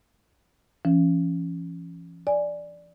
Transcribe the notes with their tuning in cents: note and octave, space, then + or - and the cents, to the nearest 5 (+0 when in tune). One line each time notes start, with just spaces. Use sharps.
E3 +45 C#4 +0
D5 +0 G#5 +0